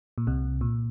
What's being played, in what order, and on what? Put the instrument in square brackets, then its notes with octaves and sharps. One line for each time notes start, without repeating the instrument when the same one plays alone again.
[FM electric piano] A#2
C2 C3
A#2